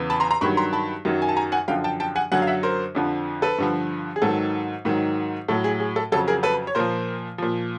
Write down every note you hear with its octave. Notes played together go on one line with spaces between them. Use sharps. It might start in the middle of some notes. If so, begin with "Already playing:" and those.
Already playing: E2 C#3 E3
A5 B5
A#5 C6
A#5 C6
G2 D#3 F#3 B5 C#6
A#5 C6
A5 B5
F#2 D#3 F#3
G#5
A5
G#5 A#5
F#5 G#5
F#2 D3 F3 F5 G5
G5 A5
G5 A5
F#5 G#5
F#2 D3 F#3 F#5 G#5
F5
E5 F#5
A#4 C5
F2 D3 F3
A4 B4
G2 D3 F3
G#4
G#2 D#3 F#3 A4
G#2 D#3 F#3
A2 F#3 A4
G#4
G#4
A4
F2 C#3 F#3 A4
G#4 A#4
A4 B4
C#5
A#2 F3 A#4 C5
A#2 F3